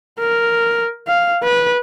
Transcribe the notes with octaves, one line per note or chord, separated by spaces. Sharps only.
A#4
F5
B4